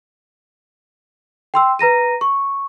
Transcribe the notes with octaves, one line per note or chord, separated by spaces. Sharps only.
G5 C6 E6
B4 A#5 A#6 D#7
C#6